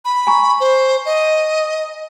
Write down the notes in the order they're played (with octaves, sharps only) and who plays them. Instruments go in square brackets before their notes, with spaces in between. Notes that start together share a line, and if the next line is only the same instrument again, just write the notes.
[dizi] B5
[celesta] G#5 A#5 C#6
[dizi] C5
D#5